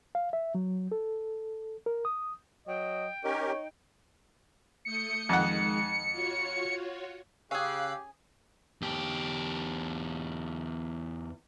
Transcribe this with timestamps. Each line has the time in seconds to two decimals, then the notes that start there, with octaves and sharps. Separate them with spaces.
0.15 F5
0.33 E5
0.55 F#3
0.92 A4
1.86 A#4
2.05 D#6
2.67 F#3 D#5 G5
3.24 C#4 D#4 G4 A#4 C#5
4.85 A3 D#6 G6 C#7
5.29 F2 D#3 G#3 D#4 F#5
6.11 F4 F#4 C#5
7.51 C#3 C#4 G4 G#4 F5 E6 F#6
8.82 E2 G4